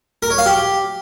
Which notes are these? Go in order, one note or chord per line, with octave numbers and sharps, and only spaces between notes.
A#4
C#5
F5
G4